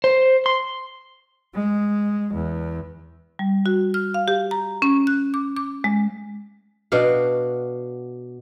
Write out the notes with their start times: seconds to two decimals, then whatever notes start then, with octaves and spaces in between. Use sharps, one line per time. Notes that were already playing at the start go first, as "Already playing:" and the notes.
0.04 C5
0.46 C6
1.55 G#3
2.34 E2
3.39 G3
3.66 F#4
3.94 F6
4.14 F5
4.28 G4
4.51 A#5
4.82 C#4
5.07 F#6
5.34 D6
5.56 D6
5.84 G#3
6.92 B2 D4 F#4 F5